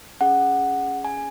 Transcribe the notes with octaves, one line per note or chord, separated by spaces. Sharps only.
C#4 G#4 F#5
G#5